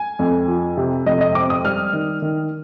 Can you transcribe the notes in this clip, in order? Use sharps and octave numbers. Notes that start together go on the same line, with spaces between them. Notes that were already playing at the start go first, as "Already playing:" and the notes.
Already playing: G#5
F2
F3
C3
F2 D#5
D#5
C4 D6
D#6
G3 F6
D#3
D#3